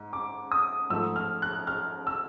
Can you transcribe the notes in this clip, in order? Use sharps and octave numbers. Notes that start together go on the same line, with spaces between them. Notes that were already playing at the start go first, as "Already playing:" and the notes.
Already playing: G#2
D6
D#6
G#2 F3 A3 E6
F6
F#6
F6
E6